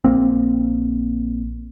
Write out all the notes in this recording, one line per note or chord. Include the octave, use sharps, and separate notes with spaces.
A#1 A#3 C4